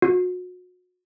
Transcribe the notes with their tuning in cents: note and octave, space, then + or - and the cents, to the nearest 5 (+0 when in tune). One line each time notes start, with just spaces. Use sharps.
F#4 -35